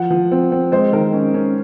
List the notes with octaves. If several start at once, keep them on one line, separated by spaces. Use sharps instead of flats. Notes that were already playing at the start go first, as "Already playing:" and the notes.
Already playing: F3 F#5
F3
C4
C4
G#3 C5
D#3 A#4
C#4
C#4